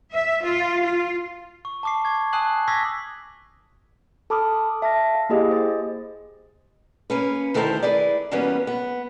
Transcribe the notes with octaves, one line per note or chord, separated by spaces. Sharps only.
E5
F4
F4
C#6
A5 D6 C7
C#6 G#6
G#5 A5 D#6 F#6 C7 F#7
C#6 D6 E6 G#6 A#6 B6
A4 A5 B5 D6 D#6 F6
E5 A5 F6 A#6
F5
A#3 E4 G4 G#4 D#5
C5 D#5 A6
A#3 C#4 B4
D2 D#3 A3 E4 A#4 C5
E4 G#4 B4 D5
E3 F#3 G3 A#3 B3 C#4
B3